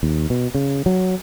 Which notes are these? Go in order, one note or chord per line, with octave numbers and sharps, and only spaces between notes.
D#2
B2
C#3
F#3